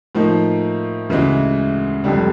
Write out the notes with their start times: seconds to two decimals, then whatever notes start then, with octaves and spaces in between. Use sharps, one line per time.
0.15 A2 F3 A#3 D#4
1.09 D2 C#3 E3 G#3
2.04 F1 F2 D3 G3